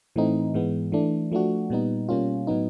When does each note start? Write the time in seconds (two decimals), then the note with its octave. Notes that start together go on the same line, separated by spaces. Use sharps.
0.16 A2 E3 A3 C4 D#4
0.54 G#2 E3 G#3 B3
0.92 E3 A3 D4
1.32 F3 A3 D4 F#4
1.70 A#2 G3 B3 D#4
2.09 B2 G3 A#3 C#4 F4
2.47 A2 F#3 B3 D#4